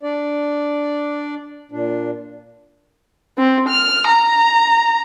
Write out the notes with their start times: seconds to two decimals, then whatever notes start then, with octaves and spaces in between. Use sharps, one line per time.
0.03 D4 D5
1.72 A#2 D4
3.38 C4
3.68 F6
4.08 A#5